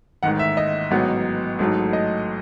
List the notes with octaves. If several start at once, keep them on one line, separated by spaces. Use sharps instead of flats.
A1 G#2 D#3 F#5
E5
D#5
A1 G#2 F#3 B3
A1 G#2 F#3 A3 D#4
D#5